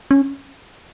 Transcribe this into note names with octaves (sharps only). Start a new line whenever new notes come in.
C#4